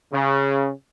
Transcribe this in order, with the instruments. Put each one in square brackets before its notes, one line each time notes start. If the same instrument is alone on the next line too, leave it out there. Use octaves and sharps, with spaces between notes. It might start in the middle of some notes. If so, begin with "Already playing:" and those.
[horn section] C#3